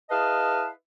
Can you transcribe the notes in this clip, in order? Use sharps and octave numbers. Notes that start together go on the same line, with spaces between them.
E4 G#4 B4 D#5 F5 A5